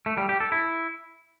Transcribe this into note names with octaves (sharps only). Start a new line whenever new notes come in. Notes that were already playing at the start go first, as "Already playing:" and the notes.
A3
G3
G4
A4
E4